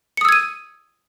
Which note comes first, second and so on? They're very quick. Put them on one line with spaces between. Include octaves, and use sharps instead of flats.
C#7 D#6 E6 G#6 D#7